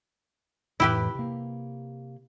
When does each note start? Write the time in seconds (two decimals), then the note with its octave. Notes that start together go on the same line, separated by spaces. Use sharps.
0.80 F2 A2 E3 E4 G4 B4
1.15 C3 A#3